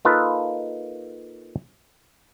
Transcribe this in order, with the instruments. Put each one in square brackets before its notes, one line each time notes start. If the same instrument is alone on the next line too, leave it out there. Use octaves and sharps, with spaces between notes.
[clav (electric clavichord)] A#3 D#4 F4 A4 B4